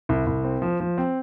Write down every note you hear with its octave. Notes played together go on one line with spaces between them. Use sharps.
C2
C2
C4
F3
F3
C4